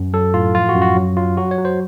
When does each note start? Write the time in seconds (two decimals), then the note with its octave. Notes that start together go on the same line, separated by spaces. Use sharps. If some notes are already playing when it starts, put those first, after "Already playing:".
Already playing: F#2
0.13 F#3 A4
0.34 A2 F4
0.55 F3 F4
0.69 F#4
0.75 F#2
0.82 F#4
0.96 F#3
1.17 F#3 F4
1.37 F#3 F#4
1.51 C#5
1.58 F#3
1.65 C5